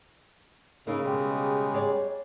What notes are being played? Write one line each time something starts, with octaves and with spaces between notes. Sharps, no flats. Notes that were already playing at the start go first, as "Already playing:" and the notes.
C#3 A#3 D#4 E4 A#4
B2 G3 G#3
G#4 C#5 D5